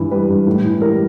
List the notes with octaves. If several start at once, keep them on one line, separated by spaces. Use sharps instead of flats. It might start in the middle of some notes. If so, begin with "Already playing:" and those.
Already playing: G2 E3
G3 B4
G2
A2
E3
G3 A#4